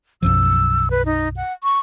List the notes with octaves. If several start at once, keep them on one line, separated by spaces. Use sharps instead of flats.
B1 F#2 F3 E6
B4
D#4
F#5
C#6